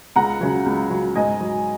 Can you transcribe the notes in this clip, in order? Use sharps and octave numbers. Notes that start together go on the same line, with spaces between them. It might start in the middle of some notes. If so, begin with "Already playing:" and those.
C#2 F#5 A#5
C#3 F#3
C#2
C#3 F#3
G#2 D#5 G#5
F#3